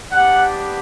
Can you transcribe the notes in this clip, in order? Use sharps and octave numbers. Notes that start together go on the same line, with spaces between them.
B3 D4 G4 F#5